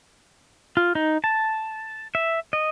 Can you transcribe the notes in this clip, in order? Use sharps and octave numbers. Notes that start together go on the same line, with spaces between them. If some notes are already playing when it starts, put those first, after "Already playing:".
F4
D#4
A5
E5
D#5